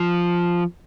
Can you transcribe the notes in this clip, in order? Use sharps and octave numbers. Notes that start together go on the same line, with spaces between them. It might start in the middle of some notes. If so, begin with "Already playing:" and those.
Already playing: F3